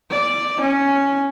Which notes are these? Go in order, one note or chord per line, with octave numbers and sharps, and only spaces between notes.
D5
C#4